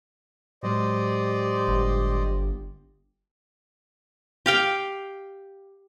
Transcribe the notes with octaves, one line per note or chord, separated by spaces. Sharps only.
A2 F#3 G#3 G4 C5 D5 D#5
G1
G4 F5 G5